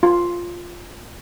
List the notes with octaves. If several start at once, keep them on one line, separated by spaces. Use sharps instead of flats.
F4